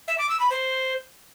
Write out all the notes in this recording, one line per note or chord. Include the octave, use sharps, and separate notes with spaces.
E5
D6
E6
B5
C5